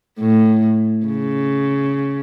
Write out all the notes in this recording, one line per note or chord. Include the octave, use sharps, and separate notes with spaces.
A2
C#3